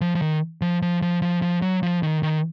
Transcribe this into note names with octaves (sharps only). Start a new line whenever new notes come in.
F3
F3
D#3
F3
F3
F3
F3
F3
F#3
F3
D#3
D#3